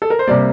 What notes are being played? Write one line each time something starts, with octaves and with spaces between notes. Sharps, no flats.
A4
A#4
C5
C3 G3 A#3 D5